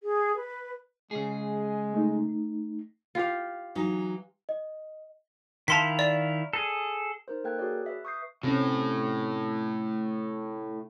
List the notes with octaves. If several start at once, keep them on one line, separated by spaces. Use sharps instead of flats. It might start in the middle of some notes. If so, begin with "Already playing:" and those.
G#4
B4
C#3 G#3 G#4
A3 D#4
F4 G4 F5
E3 F#3 D#4
D#5
D#3 E4 F5 A5 C6 B6
D5
G#4 A4
D#4 A#4 C5
A#3 A4 A#4 G5 F#6 G#6
F#4 G#4 C#5 D5
B4 E5
C#6 D#6 G6 C7
A2 C3 C4 C#4